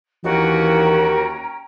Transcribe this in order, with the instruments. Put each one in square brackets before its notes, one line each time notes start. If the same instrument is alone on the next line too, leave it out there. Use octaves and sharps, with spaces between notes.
[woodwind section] D#2 [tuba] E3 [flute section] C#4 G5 A#5 [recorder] F#4